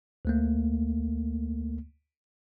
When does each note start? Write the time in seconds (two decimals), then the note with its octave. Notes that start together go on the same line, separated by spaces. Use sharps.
0.25 D2 A3 A#3